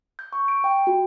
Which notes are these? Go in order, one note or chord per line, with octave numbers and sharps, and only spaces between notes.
G6
C#6
D7
G5
F#4